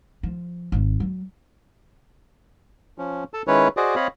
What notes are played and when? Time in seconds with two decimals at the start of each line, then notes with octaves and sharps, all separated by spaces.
0.23 F3
0.72 G#1
1.00 F#3
2.98 F3 C#4
3.34 A4 A5
3.47 D#3 G#3 C#4 E4 B4 C#5
3.77 F#4 G#4 C5 D5 D#5
3.96 C4 C#5 D#5 F5 B5